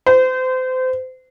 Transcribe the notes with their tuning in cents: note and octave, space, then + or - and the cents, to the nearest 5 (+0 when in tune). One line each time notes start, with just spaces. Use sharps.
C5 -30